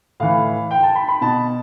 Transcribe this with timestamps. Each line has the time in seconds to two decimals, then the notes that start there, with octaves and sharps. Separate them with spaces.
0.20 A2 E3 F5
0.71 G5
0.83 A5
0.95 B5
1.08 B5
1.21 B2 A5